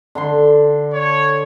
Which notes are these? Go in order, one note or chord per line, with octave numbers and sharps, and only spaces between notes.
D3 A4 C6
C#5